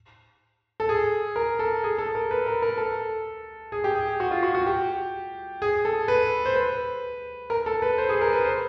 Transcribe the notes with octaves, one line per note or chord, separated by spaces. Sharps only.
A4
G#4
A#4
A4
G#4
A4
A#4
B4
A#4
A#4
A4
G#4
G4
G#4
F#4
F4
F#4
F#4
G4
G#4
A4
B4
C5
B4
A#4
A4
B4
C5
G#4
A#4
B4
C5